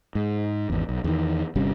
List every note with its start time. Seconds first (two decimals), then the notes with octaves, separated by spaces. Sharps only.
0.15 G#2
0.70 G#1 E2
0.89 B1
1.04 E2 D#3
1.55 G1 C3 G3 C#4